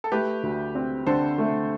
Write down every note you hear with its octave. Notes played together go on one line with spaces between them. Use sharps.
A4
A3 G4 B4
D2
C4
D3 A4 C5
A3